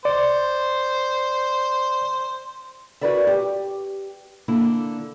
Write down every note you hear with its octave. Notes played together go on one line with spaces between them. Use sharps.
C5 D5
E4 F#4 A#4 B4 D5 E5
G4
D3 A#3 E4